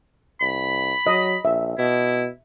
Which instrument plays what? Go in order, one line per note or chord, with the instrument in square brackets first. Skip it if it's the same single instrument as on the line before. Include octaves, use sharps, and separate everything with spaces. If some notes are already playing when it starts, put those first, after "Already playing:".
[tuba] C2 [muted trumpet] B5
[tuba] F#3 [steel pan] D#5
[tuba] A#1 [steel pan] E5
[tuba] B2 [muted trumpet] E4